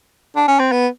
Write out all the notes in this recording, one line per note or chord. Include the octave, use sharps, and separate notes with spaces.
D4
C#4
C4
B3